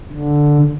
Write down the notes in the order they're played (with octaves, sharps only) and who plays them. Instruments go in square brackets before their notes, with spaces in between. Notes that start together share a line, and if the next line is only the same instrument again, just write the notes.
[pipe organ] D3